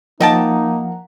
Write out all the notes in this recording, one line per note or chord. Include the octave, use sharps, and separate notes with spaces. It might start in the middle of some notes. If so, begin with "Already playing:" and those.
F3 A#3 D#4 D#5 F#5 G5 A5 A#5